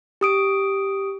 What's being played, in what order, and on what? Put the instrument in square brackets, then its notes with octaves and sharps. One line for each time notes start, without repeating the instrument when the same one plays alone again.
[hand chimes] G4 D#6 D7